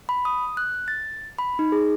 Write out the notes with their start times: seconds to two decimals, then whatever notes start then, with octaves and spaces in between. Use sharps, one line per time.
0.09 B5
0.25 D#6
0.57 F#6
0.88 A6
1.39 B5
1.59 D#4
1.72 G#4